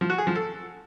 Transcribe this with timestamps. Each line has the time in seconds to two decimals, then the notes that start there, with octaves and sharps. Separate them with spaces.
0.01 F3
0.10 F#4
0.18 G#4
0.27 F3
0.35 A4